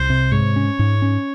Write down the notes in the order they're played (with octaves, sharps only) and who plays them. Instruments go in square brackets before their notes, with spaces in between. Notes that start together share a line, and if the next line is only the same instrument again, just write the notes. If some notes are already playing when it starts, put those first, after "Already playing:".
Already playing: [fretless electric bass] C2 [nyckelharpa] C5
[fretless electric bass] C3
[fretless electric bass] G#2 [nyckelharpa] C#5
[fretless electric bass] C#4
G#2
C#4